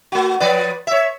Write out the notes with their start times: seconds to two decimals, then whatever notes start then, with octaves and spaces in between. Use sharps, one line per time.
0.12 A3 F#4
0.40 F3 B4 D5
0.87 C#5 E5